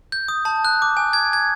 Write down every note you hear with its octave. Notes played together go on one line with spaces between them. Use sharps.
G6
D#6
A5
F#6
D6
G#5
G#6
G#6